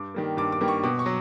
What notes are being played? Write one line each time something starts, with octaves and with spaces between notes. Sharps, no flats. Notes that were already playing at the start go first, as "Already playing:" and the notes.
Already playing: G2 D6
D#3 G3 A#3
G2 D6
D6
D#3 G3 A#3
C#6
B2 D6
C#6
F#3